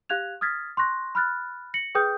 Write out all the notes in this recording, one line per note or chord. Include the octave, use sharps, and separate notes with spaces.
G4 F5 F#6 G#6 F7
D#6 F6 G#6 A6 B6
C6 C#6 F#6 A#6
B5 F6 F#6 A6
A#6 C#7 F#7
G#4 B4 G5 D#6 G6